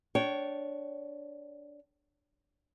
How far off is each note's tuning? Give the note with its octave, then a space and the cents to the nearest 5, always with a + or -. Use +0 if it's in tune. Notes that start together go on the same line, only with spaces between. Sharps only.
D4 -10 C#5 +0 G5 -25